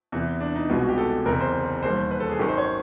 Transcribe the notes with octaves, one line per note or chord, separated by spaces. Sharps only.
E2 C3 E3
D4
D#4
C2 B2 G#3 B3 F4
F#4
G4
A4
F#1 E2 C3 A#4
C5
E1 D#2 D#3 G3 C5
B4
A4
G#4
G#1 F#2 D#3 G4
C5
C#5